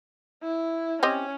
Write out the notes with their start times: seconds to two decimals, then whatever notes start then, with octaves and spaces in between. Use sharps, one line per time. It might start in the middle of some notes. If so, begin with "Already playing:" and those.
0.43 E4
1.03 C4 C#4 G4 D#5